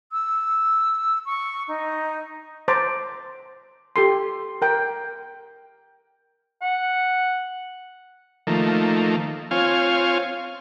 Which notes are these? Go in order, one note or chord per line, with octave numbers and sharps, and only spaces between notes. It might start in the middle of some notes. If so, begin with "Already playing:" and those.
E6
C#6
D#4
C5 A5 A#5 D6
G4 A4 C6
A#4 G5
F#5
D#3 F3 A3 A#3
C4 F4 C#5 F5 G#5